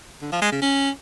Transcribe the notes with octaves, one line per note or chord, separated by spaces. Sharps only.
D3
F3
G#3
C#3
C#4